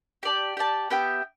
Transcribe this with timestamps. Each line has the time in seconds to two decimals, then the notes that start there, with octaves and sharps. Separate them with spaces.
0.23 G4 D5 A5
0.57 G4 D5 A5
0.90 B3 G4 E5 G5